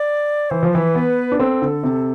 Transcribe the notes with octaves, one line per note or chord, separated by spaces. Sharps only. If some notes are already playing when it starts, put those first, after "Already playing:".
Already playing: D5
E3 C5
F3
E3 B4
B3
D4
C4 A4
D3
C3